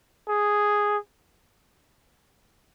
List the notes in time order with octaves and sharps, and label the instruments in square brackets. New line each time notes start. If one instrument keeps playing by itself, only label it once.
[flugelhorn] G#4